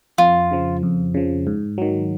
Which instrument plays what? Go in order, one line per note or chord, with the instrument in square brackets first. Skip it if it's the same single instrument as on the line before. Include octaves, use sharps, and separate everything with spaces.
[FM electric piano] F2 [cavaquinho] F4
[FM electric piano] C#3 F3
F2
C#3 F3
G#2
D#3 F#3